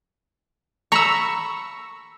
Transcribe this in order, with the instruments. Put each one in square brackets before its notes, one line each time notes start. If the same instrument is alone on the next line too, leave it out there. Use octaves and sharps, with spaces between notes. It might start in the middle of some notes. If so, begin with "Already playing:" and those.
[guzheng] A#5 B5 [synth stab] C#6 E6